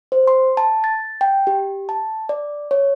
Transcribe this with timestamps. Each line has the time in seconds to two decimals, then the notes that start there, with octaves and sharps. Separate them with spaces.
0.12 C5
0.27 C6
0.57 A5
0.84 A6
1.21 G5
1.47 G4
1.89 A5
2.29 D5
2.71 C#5